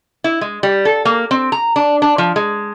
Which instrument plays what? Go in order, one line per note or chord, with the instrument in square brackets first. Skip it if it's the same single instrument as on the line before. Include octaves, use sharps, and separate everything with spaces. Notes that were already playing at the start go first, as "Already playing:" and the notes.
[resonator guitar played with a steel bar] E4
G#3
G3
A4
A#3
C4
A#5
D4
D4
F3
G#3